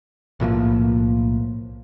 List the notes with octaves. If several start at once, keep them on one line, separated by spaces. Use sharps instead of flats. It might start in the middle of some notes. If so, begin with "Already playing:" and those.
B1 A2 F3 A#3